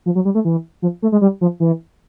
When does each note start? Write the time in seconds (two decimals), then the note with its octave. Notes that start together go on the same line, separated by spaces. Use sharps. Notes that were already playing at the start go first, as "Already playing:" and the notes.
0.06 F3
0.15 F#3
0.25 G3
0.35 A3
0.45 E3
0.82 F3
1.02 A3
1.12 G#3
1.21 G3
1.41 F3
1.60 E3